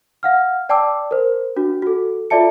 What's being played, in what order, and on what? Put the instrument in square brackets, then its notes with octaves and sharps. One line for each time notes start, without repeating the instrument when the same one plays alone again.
[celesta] F5 F#5 F6
D5 G5 A5 D6 E6
A#4 C5
D4 F#4
F#4 A4
F4 A4 D5 E5 A5 C#7